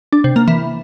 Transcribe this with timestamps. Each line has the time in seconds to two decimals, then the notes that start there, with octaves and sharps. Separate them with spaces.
0.13 D4
0.24 C3
0.36 A#3
0.48 E3